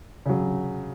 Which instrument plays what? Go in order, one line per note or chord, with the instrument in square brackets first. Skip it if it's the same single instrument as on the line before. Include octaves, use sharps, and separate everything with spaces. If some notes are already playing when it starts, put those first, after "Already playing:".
[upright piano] C#3 F#3